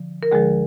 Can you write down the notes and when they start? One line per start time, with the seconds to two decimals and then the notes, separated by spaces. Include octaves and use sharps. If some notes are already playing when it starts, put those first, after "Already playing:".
Already playing: D3 F3
0.23 A#4
0.31 D2 D3 F3 G#3 G#4